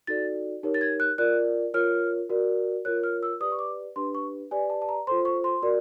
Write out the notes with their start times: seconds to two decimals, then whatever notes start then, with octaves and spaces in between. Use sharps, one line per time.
0.07 D#4 F#4 A4 D5 A6
0.63 D#4 G4 A#4 C#5
0.74 A6
0.81 G#6
1.00 F#6
1.18 F4 A#4 D5 F#6
1.74 F4 A#4 C#5 F6
2.29 F#4 A#4 D5
2.85 F4 A#4 C#5 F#6
3.04 F6
3.23 E6
3.40 G4 B4 D5 D#6
3.52 C#6
3.59 D6
3.96 D4 G4 B4 C6
4.15 C#6
4.51 G4 B4 D5 G#5
4.70 A5
4.82 A5
4.89 A#5
5.07 F4 A4 C5 C6
5.25 C#6
5.44 C6
5.62 F#4 A#4 D5